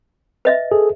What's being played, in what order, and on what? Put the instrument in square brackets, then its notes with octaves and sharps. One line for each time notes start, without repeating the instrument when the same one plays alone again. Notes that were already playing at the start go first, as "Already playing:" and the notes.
[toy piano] B4 D#5 E5
[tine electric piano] G#4 A4